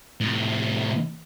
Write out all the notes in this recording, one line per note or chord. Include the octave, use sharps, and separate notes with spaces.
A2 C3